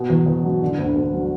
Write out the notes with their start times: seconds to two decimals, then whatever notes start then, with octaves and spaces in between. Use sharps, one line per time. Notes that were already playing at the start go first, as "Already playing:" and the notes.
Already playing: B2
0.10 E2
0.26 E2
0.45 F#3
0.62 D3
0.79 D2
0.96 D2
1.14 F#3